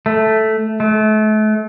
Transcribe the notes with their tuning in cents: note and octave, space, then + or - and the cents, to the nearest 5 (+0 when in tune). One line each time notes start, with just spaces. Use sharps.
A3 -5
A3 -35